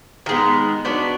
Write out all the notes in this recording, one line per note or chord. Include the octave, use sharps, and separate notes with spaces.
D#3 G#3 B3
F#3 B3 D4